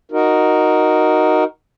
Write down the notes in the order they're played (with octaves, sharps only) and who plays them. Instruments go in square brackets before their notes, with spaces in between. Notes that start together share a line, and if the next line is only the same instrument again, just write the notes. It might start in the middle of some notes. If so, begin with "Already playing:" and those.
[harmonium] D#4 F#4 A#4